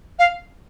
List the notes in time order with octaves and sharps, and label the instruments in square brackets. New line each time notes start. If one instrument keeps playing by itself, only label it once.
[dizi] F5